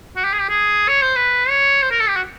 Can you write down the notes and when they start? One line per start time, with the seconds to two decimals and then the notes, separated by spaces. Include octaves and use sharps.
0.16 F#4
0.24 G4
0.33 G#4
0.41 G4
0.49 G#4
0.88 C#5
1.02 C5
1.16 B4
1.49 C#5
1.82 C5
1.91 A#4
2.00 A4
2.08 G4
2.16 F#4